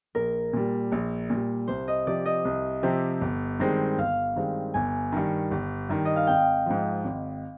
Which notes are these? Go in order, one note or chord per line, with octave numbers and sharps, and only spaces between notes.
A#1 A#4
A#2 G3
A#1
A#2 G3
C2 C5
D#5
C3 F3 C4 G4 D5
D#5
C2
C3 F3 C4 G4
G1
G2 D#3 G#3 C4
G1 F5
G2 D#3 G#3 C4
G1 G#5
G2 D#3
G1
G2 D#3
D#5
F5
G#1 G5
G#2 F3
G#1